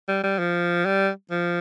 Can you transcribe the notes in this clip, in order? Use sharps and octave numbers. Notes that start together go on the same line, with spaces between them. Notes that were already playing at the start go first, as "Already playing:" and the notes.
G3
G3
F3
G3
F3